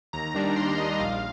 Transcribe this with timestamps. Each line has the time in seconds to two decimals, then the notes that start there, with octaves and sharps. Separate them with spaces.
0.13 D#2 A#5
0.34 D#3 G3 D4
0.56 D#2 C6
0.78 D#3 G3 D4 D#5
0.99 A#1 F5